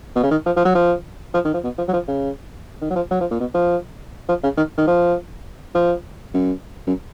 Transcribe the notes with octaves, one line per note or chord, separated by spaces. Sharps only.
B2
C#3
D#3
F3
F3
F#3
F3
F3
D#3
F3
B2
F3
F#3
F3
C#3
D#3
F#3
F3
F#3
F3
A#2
B2
F3
F3
C#3
D#3
D#3
F3
F3
F#2
F#2